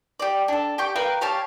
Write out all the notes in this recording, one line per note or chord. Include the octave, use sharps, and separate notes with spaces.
G4 D5
D4 A4
G4 G5 C#6
A#4 B4 F5 G5
G4 C#5 F5 A5